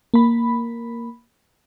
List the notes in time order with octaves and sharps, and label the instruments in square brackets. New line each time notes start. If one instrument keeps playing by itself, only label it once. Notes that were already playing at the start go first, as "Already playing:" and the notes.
[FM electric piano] A#3 B5